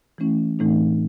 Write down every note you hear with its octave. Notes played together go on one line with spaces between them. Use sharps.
E3 A3 C#4 E4
A2 E3 A3 C4 D#4